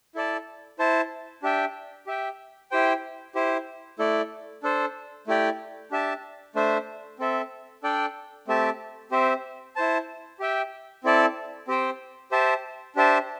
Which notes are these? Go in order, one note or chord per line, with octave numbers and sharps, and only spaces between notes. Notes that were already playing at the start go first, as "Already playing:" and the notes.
E4 A4 D5 A5
E4 C5 A5
D4 G4 E5 G5
G4 E5 G5
E4 G4 C5 G5
E4 G4 C5
A3 E4 A4 D5
D4 A4 C5
A3 E4 G4 D5 G5
D4 G4 E5 A5
A3 D4 C5 E5
C4 A4 E5
D4 A4 D5 G5
A3 C4 G4 E5 A5
C4 G4 C5 E5
E4 C5 A5
G4 E5 G5
C4 E4 A4 D5 A5
C4 G4 C5 G5
G4 C5 E5 A5
D4 G4 C5 E5 A5